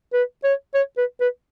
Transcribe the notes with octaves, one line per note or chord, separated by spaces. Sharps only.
B4
C#5
C#5
B4
B4